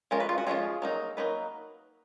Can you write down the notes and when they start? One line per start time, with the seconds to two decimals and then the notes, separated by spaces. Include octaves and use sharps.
0.11 F3 G#3 C#4 F4 A#4
0.20 B4
0.29 F4
0.38 F#4
0.47 F3 G#3 C#4 F4 G#4
0.82 F#3 A#3 D#4
1.17 F#3 A#3 D#4 B4